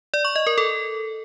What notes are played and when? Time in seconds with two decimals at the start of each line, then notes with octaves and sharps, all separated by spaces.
0.14 D5
0.25 C#6
0.36 D#5
0.47 A#4
0.58 A4